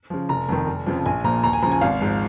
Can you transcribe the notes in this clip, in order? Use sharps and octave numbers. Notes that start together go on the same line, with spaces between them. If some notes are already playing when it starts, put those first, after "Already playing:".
C#3 F3
F1 A#5
F2 D#3
F1
F2 C#3 F3
A#1 G#5
A#2 F3 A#5
D#2 A#5
G#5
C#3 F3 A#5
G#5
G#1 F5
G#2 F3